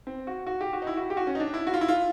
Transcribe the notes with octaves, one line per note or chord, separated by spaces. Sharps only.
C4
F#4
F#4
G4
F#4
D#4
E4
F#4
G4
F#4
C#4
D#4
D4
E4
F#4
F4
E4
F4